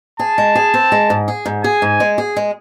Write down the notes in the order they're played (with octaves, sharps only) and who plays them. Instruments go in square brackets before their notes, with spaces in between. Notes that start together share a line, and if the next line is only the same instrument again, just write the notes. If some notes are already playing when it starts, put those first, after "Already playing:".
[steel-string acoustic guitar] G#4 [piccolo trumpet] A5
[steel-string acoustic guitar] G#3
G#4
C4
G#3
G#2
G#4
G#2
[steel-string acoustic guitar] G#4 [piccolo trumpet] G#5
[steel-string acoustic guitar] G#2
G#3
G#4
G#3